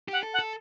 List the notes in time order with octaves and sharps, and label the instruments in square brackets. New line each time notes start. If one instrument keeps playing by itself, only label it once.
[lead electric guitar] G4 [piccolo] F#5
[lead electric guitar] A4
[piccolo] F#5
[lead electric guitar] A4